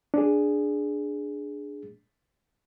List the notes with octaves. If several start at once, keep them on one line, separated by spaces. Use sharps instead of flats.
D4 G#4